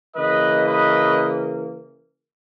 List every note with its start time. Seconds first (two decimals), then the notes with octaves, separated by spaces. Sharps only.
0.16 C#3 E3 A#3 B4 D#5
0.66 B4 D#5